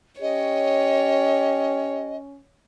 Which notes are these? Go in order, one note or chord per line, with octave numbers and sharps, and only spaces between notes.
C#4 G4 C#5 D#5